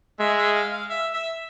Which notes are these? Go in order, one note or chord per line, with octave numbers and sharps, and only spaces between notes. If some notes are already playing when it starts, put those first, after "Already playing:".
G#3 E5
E5
F5
F5
E5
E5